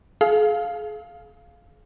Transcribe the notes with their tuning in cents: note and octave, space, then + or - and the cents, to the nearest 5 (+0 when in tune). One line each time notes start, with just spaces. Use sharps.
G#4 +35 F5 +0